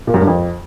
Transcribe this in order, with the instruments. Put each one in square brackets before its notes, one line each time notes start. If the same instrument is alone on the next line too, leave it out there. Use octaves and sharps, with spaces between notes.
[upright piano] A#2
F#2
G2
F2